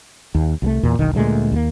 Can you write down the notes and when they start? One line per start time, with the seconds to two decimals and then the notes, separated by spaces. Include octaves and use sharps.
0.35 D#2
0.62 C2 F#3 A3
0.83 E2 A#2
0.99 E1 B1 D#3
1.15 D2 A#2 G#3 A3
1.52 D#2 G3 A#3